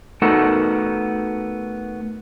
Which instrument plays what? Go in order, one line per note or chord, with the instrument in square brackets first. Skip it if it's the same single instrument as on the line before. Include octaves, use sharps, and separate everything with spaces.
[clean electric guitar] A3 B3 D#4 F#4 A4 A#4